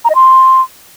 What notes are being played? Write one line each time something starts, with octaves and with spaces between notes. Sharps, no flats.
A#5
D#5
C6